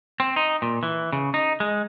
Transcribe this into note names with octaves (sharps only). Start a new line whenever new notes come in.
C4
D#4
A#2
E3
C#3
D#4
G#3